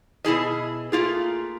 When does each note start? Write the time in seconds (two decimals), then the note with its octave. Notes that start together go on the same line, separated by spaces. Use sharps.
0.25 B2 E4 G#4 D#5
0.92 A3 A#3 F4 G#4